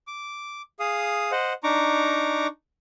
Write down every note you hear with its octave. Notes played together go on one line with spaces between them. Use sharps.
D6
G#4 F5 D#6
C5 D#5 F#5
D4 D#4 A#5 C#6 D6